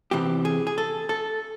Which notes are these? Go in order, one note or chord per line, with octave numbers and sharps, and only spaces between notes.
E2 C3 E3 G4
G#4
G#4
A4
A4